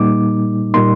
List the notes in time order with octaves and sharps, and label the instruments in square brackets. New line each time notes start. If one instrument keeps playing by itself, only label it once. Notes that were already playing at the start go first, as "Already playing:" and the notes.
Already playing: [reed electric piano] A#2 G3 A#3 D#4 D6
A#2 G3 A#3 D#4 C6